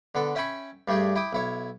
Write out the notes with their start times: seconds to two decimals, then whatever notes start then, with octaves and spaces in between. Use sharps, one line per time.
0.15 D3 B3 A4
0.35 C#4 E5 G5 G#5 B5 C#6
0.88 G2 G3 A3 G4 G#4
1.16 E4 G5 D6 D#6
1.33 B1 E4 C#5